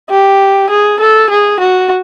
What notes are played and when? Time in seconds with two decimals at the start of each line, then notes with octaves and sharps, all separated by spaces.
0.10 G4
0.70 G#4
1.00 A4
1.30 G#4
1.60 F#4